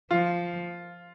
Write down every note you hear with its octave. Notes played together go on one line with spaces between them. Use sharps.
F3 F4